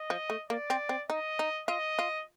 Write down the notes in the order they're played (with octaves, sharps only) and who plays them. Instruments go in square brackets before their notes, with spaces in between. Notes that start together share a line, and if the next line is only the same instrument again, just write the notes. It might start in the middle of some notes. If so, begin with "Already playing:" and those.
Already playing: [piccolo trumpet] D#5
[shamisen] F3
A3
[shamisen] A#3 [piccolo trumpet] D5
[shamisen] C4
C4
[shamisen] D#4 [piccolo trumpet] D#5
[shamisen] D#4
[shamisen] F4 [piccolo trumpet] D#5
[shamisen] F4